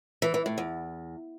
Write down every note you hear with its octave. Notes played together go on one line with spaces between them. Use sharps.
E3
E3
A2
E2